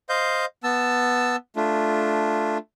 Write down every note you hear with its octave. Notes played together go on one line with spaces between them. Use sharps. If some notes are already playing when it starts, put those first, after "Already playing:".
C5 D#5 F5 G6
B3 A5 E6
A3 D4 F4